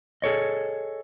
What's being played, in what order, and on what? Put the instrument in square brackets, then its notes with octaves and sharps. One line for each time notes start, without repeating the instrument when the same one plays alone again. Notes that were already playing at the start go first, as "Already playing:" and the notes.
[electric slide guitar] G#4 A4 C#5 D#5